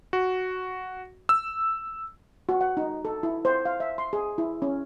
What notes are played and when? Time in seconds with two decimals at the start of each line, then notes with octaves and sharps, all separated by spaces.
0.13 F#4
1.29 E6
2.49 F#4
2.61 F#5
2.77 D#4
3.05 A4
3.23 E4
3.45 C5
3.65 F5
3.80 E5
3.98 C6
4.13 G#4
4.38 E4
4.62 C#4